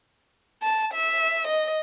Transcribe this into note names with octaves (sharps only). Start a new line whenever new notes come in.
A5
E5
D#5